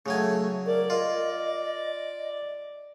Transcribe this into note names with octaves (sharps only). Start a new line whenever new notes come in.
C#3 F#3 A3 G#5
A#4 D5
F4 D#5